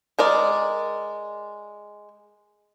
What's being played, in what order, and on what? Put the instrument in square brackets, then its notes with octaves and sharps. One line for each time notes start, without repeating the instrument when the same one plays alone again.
[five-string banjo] G#3 A#4 D5